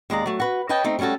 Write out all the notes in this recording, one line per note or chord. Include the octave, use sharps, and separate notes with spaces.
D#2 G#3 D5 A#5
F#3 A3
F#4 B4
B4 C#5 D#5 G5 A5
A3 C4 D#4
G3 A3 C#4 F#4 A4